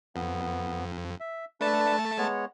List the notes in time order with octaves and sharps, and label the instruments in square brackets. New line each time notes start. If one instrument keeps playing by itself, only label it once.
[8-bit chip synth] F2 [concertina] B3
[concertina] E5
[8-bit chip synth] A3 A5 [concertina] D4 B4
[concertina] G#3 B3 C#5